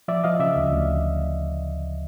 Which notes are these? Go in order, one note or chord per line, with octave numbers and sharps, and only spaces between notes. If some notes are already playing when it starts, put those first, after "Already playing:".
F3 D5 E5
F3 D#5 F5
C#3 D5 E5
D2
D2